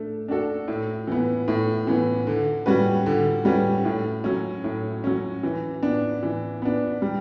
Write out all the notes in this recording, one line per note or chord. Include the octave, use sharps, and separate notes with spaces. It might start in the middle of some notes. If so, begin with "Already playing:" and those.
Already playing: A3 D4
D4 F#4 A4
A2
E3 B3
A2
E3 B3
D3
G3 C#4 F#4 B4
D3
G3 C#4 F#4 B4
A2
F#3 C#4
A2
F#3 C#4
E3
B3 D4
E3
B3 D4
G3